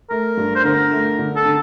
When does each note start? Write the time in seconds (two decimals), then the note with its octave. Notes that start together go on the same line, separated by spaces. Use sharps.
0.10 A3 A#4
0.37 G2
0.56 C5
0.64 D3 A#4
0.91 A3
1.18 D3
1.36 A4
1.45 D3